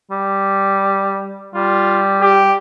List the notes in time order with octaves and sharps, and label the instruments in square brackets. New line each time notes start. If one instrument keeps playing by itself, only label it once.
[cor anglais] G3
[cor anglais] G3 [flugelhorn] F4
[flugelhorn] G4